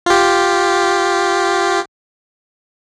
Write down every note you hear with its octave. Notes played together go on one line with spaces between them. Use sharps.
F4 G4